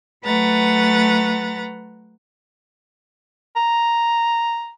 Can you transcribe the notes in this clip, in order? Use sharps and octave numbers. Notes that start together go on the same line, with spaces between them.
F#3 A3 B4 F#5 A#5 A6
A#5